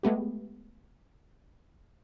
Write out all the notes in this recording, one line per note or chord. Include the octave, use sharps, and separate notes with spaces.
G#3 A3 B3 G4